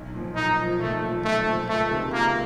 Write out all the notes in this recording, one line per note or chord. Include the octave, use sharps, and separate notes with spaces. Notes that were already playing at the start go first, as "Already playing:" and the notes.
Already playing: B1
A#2 F3
B1 D#4
A#2 F3
B1 A3
A#2 F3
B1 A3
A#2 F3
C#2 A3
C3 D#3 G#3
C#2 A#3